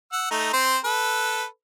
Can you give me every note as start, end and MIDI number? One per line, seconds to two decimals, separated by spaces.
0.12 0.26 78
0.12 0.26 88
0.31 0.50 57
0.31 0.50 63
0.53 0.78 60
0.53 0.78 72
0.84 1.45 69
0.84 1.45 71